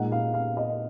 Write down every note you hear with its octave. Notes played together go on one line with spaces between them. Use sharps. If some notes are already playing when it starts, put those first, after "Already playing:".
Already playing: A#2 G#3 D#4 F#5
F5
F5
D#5